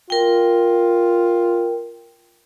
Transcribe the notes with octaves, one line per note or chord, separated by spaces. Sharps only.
F4 A#4 G5